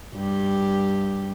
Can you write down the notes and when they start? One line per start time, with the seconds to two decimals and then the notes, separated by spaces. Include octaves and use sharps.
0.15 G2 G4